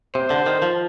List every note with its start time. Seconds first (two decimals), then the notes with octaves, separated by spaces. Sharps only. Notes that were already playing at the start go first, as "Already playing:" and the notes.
0.15 C3 C5
0.30 D3
0.46 D#3
0.62 F3